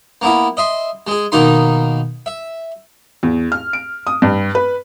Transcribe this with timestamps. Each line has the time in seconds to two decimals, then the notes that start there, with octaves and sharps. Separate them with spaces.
0.22 A#3 B3 E4
0.57 D#5 E5 C6
1.07 G#3 G#4
1.32 B2 D#3 A#3 D#4 C6
2.26 E5
3.23 E2
3.52 F6
3.73 D7
4.07 D#6
4.22 G2
4.55 B4